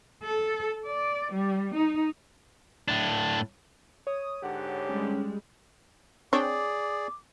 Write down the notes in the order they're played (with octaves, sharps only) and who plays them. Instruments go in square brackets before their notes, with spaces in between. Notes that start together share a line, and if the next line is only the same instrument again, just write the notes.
[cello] A4
D5
G3
D#4
[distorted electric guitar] A2 D4
[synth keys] C#5 [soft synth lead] D#6
[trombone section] G#2 D3 G4 [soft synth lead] F#5
[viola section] G3 G#3 [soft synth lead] C#4
[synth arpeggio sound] C4 D4 G5 [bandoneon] G#4 D5 [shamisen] C#5 [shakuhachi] D6